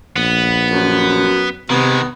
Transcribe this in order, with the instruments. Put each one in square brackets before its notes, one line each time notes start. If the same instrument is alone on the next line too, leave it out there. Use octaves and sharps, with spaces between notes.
[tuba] A#1 [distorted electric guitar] B3
[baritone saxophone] F#2
[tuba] C3 [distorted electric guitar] D#3 G#3 [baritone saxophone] B3